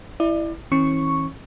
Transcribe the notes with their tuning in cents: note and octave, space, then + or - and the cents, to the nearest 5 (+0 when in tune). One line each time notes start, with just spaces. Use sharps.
E4 +0 D5 +35
E3 -35 C#4 -40 C#6 +0